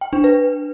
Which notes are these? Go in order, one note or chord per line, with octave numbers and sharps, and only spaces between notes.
G5
D4
B4